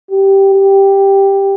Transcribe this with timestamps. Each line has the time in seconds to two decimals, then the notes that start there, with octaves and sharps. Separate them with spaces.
0.11 G4
0.55 G4